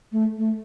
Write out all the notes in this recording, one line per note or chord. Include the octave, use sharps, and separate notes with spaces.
A3
A3